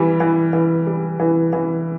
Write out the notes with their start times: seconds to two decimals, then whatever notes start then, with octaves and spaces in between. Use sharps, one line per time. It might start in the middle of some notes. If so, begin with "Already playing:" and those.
Already playing: E3 G3
0.20 E3
0.53 E3
0.87 G3
1.19 E3
1.53 E3